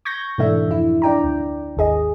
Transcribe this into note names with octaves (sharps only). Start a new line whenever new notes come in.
C#6 G6 G#6 A#6
G#2 B2 E3 A3 D4 E5
F2 E4
D4 D5 G5 A#5
D2
G#1 D#2 G#4 D#5